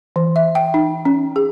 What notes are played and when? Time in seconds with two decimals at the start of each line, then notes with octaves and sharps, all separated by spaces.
0.16 E3
0.36 E5
0.55 G5
0.74 D#4
1.05 C#4
1.36 G#4